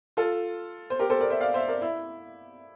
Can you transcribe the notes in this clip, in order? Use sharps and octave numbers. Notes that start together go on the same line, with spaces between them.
F4 A4
C5
G4 A#4
A4 C5
A#4 D5
C5 E5
D5 F5
C5 E5
A#4 D5
E4